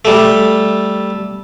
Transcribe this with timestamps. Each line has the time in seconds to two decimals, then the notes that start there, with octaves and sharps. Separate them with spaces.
0.05 G3 A3